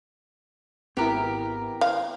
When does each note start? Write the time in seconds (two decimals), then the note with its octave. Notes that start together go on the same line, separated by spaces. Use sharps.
0.97 G#1 B3 C4 E4 G4 A#4
1.81 F5